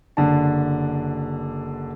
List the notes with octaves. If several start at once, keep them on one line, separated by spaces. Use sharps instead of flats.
F#1 D3 D4 A5